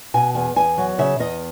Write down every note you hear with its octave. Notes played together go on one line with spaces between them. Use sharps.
B2 G#5
E2 G#5
E2 G#5
F#3
C#3 E5
E2 D#5